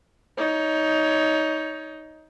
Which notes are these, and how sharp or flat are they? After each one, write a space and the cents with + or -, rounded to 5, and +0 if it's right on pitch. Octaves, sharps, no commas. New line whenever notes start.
D#4 +15 C#5 +25